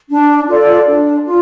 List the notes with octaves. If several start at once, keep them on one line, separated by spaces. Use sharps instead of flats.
D4
F4 A4 D5
D4
F4